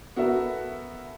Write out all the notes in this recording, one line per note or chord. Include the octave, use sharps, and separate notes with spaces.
B3 F#4 A4 A#4 E5